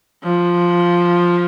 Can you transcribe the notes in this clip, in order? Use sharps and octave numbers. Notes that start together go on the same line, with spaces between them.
F3